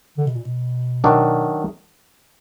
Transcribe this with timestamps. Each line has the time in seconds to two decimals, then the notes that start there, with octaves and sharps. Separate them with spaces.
0.18 D3
0.27 B2
0.36 A#2
0.45 B2
1.04 D#3 F#3 D4